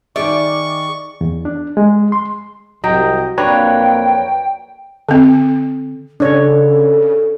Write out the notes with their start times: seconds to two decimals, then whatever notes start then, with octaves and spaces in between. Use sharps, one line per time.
0.16 D#3 G#4 D5 E5 C#6
1.21 E2
1.45 D4
1.77 G#3
2.12 C6
2.84 C2 F#3 D#5 G5
3.38 F2 A#3 D4 B4 C#5 G5 A#5
5.09 D3 C4
6.20 C#3 D4 A4 C#5